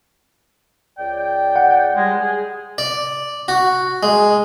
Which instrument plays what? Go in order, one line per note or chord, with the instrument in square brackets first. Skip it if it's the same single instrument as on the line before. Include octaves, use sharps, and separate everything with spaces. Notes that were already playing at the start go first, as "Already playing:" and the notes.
[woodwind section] C#2 D5 G5
[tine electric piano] F#5
[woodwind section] G3 G#3
G#4
[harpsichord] D5
F#4
G#3